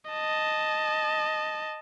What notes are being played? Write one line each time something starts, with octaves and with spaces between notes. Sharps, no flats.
D#5 A5